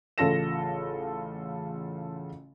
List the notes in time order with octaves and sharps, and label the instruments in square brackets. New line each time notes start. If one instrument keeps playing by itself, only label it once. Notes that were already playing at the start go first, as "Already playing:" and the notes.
[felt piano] A1 C#3 F4 A4 A#6 E7